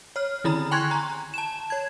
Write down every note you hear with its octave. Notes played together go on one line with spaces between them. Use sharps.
C#5 F6
D3 D#3 E4 A#5 B5
G5 G#5 C6 C#6 F#6 G#6
A#5
A5 E7
C#5 G#6